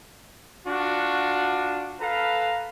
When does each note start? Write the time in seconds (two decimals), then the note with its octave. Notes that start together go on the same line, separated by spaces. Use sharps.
0.67 D4 F4 F#4
2.00 A4 B4 F5 A#5